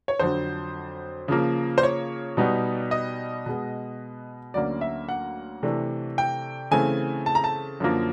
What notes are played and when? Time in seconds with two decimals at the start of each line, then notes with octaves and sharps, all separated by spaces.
0.08 C#5
0.19 F2 D3 F#3 C5
1.28 C#3 F3 A#3
1.78 C5
1.83 C#5
2.37 B2 G3 B3 D#4
2.91 D#5
3.46 B2 G#3 B3
4.54 D2 D3 F#3 A#3 C#4 D5
4.81 E5
5.09 F#5
5.63 C3 E3 A3 D4
6.18 G5
6.71 C#3 E3 A3 C4 G#5
7.26 A5
7.35 A#5
7.44 A5
7.80 F#2 D3 F3 A#3